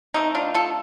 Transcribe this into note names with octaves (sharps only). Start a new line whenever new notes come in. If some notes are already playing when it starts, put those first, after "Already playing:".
C3 D#3 A3 C4 D#4
D4 F4
F4 A4